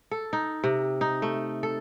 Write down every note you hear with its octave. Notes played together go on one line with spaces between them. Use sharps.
A4
D#4
C3
D#4
A3
A4